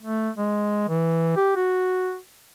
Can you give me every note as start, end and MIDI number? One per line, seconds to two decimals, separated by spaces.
0.02 0.30 57
0.38 0.87 56
0.89 1.34 52
1.36 1.51 67
1.56 2.17 66